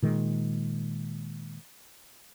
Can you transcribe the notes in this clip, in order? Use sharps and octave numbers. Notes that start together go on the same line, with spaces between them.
A#2 D#3 G#3